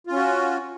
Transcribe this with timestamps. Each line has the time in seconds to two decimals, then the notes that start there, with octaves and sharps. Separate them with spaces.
0.07 F4
0.12 C#4
0.16 F#4